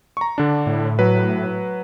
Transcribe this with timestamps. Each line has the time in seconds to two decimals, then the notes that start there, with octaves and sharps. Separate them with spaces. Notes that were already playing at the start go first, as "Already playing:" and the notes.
0.17 A#5 C#6
0.38 D3 D4
0.66 A2
0.99 F#3 B4